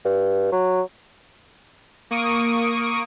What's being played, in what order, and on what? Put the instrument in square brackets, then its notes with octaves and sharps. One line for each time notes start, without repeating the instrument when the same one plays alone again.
[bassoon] G2
F#3
[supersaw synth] A#3 C#6 D#6 D7 D#7